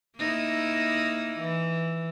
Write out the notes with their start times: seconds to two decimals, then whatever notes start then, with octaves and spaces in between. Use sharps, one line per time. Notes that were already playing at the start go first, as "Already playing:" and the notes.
0.17 A#3 D#4 E4
1.40 E3